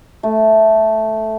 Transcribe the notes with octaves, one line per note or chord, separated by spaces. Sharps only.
A3